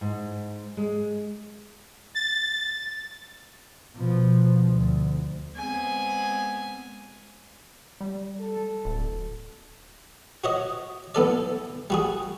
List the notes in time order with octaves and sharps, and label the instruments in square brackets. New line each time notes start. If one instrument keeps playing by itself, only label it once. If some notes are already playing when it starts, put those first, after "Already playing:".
[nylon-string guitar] G#2
G#3
[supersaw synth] A6
[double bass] B2 F3
D2
[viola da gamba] G#3 B3 C4 [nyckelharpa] G#5
[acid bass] G3
[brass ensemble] A4
[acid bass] D1
[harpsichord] F#4 C#5 D#5
B1 B3 A4 D5
G3 F#4 G#4